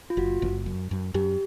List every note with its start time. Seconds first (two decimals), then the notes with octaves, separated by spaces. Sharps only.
0.10 F4
0.17 F#1 F#4
0.42 F#1
0.66 F#2
0.91 F#2
1.14 F#2 G4